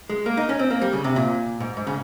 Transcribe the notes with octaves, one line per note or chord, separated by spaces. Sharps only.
G#3
A#3
D#4
C#4
C4
A#3
G3
C#3
C3
A#2
G#2
G#2
C#3